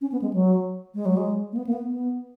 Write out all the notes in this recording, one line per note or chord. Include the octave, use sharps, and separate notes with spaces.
C#4
B3
G#3
F#3
G#3
F#3
G#3
A#3
B3
A#3
B3
B3